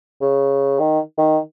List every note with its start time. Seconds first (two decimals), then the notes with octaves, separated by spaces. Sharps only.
0.21 C#3
0.79 D#3
1.18 D#3